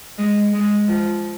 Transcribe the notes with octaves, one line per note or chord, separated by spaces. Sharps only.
G#3
G#3
F3